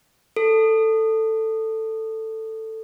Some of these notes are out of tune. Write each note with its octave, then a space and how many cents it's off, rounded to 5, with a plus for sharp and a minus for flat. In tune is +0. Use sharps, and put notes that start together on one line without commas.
A4 +10